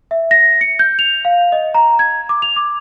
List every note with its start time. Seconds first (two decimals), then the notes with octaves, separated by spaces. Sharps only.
0.11 E5
0.31 A#6
0.61 C#7
0.79 G6
0.99 F7
1.25 F5
1.52 D#5
1.74 A#5
1.99 G#6
2.29 D6
2.42 F7
2.56 D6